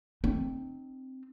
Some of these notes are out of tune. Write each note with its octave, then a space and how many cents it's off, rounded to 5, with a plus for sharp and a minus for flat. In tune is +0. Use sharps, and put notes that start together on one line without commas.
C4 +0 D#4 -40